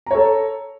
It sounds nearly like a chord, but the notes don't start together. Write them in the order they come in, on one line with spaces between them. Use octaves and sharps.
A#5 C#5 A4